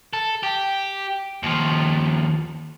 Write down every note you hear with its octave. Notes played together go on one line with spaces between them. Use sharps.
A4
G4
D#2 F3